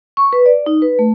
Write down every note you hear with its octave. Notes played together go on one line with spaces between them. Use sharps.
C#6
B4
D5
D#4
B4
A3